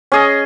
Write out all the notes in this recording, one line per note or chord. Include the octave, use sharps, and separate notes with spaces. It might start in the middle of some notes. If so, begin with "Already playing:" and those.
C#4 G#4 D#5